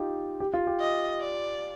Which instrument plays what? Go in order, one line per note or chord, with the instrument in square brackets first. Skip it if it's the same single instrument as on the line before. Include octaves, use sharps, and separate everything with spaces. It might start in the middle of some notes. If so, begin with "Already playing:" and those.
Already playing: [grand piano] D#4 F4 G4
G4
F4
G4
[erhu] D#5
D5